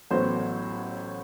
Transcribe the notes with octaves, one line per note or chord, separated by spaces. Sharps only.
A1 A2 F#3 B3 C5